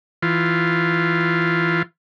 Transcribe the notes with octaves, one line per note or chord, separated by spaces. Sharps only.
E3 F4